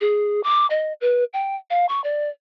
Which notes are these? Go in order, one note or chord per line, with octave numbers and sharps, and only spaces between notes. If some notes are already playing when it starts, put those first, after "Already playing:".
G#4
D6
D#5
B4
G5
F5
C#6
D5